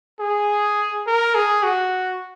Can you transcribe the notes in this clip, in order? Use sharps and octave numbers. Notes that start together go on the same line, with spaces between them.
G#4
A#4
G#4
F#4